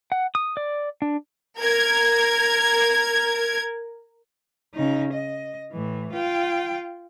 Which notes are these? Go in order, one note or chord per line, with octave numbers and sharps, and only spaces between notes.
F#5
D#6
D5
D4
A#4 G#6
C#3 D#4
D#5
A2 E3
F4 G5